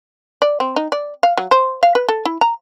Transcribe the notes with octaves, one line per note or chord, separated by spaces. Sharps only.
D5
C4
D#4
D5
F5
F#3
C5
F5
B4
A4
E4
A#5